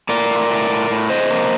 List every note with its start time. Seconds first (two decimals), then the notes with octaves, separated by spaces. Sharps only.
0.09 A2 A#4 D5
0.29 A2
0.50 A2
0.70 A2
0.90 A2
1.10 C3 C5 D#5
1.31 A#3